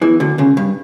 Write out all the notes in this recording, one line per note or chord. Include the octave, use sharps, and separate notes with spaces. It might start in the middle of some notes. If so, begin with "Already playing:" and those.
E2 E3
D2 D3
C#2 C#3
G2